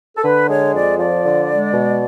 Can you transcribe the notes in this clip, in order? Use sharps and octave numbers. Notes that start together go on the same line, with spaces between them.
A4
D3 B4
G#3 C#5
F2 D5
F3 D5
D3
G#3
B2